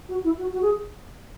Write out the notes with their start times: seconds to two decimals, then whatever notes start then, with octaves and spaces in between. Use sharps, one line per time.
0.09 F#4
0.24 E4
0.38 F#4
0.53 F#4
0.62 G#4